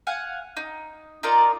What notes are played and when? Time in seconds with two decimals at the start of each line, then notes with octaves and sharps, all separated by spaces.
0.07 F5 F#5 G#5
0.57 D#4
1.23 D#4 F4 A#4 D5